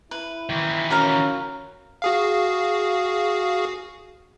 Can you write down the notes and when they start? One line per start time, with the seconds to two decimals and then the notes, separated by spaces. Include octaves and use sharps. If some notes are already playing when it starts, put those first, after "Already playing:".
0.11 E4 B4
0.50 D#3 E3
0.90 C#4 F#4 A#4 F5
2.02 F#4 G#4 F5